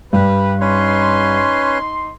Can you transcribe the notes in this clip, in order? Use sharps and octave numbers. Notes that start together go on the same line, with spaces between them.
G2 G3 B4
C#4 D#4 B4 C#5 C6